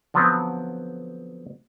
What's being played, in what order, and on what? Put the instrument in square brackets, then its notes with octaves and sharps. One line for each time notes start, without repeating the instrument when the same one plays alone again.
[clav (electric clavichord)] D3 F3 F#3 B3 C4